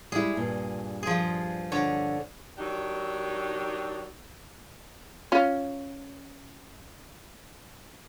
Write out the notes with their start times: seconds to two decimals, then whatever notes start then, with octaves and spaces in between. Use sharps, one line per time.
0.12 G3 G#3 E4 G#4
0.37 G2 A#2
1.03 F3 G#4
1.72 D3 C#5
2.58 D#3 F#3 D4 D#4 G4
5.32 C#4 F4